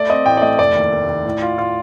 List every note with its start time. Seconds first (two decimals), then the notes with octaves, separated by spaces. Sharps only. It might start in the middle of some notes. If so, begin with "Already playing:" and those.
Already playing: A3 D5
0.10 C4 D#5
0.26 A1 G5
0.37 D5
0.42 A3 D#5
0.59 F1 D5
0.76 D#2
0.92 D#2
1.08 D#2
1.26 A2
1.42 F4
1.58 F4